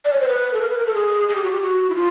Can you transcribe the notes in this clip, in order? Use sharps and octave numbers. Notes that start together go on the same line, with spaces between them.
D5
C#5
C5
B4
A4
A#4
B4
A#4
A4
G#4
G#4
G4
F#4
G4
F#4
E4
F4